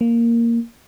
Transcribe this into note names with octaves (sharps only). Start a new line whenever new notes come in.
A#3